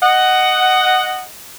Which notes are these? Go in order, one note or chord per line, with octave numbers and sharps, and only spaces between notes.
D#5 F#5